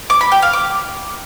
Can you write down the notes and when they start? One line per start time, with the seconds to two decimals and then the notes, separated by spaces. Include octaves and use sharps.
0.10 D6
0.21 B5
0.32 G5
0.42 F5
0.53 D6